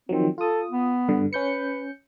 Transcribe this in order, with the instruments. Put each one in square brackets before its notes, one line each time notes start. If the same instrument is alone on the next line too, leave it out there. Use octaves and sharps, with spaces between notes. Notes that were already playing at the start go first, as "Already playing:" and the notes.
[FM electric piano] D#3 F3 F#3 [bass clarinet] C4
[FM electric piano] F4 D#6 [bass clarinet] A4
[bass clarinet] B3
[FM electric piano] G2 D3
[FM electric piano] C#4 G6 C#7 [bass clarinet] B4